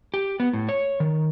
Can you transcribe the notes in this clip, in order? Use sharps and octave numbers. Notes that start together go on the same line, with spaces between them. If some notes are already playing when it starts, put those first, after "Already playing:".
G4
B3
A2
C#5
D#3